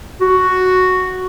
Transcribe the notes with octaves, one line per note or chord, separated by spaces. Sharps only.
F#4